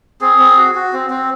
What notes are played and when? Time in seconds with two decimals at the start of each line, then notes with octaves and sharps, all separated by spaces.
0.21 C4 G#4
0.39 C4
0.58 F#4
0.75 F#4
0.93 C4
1.10 C4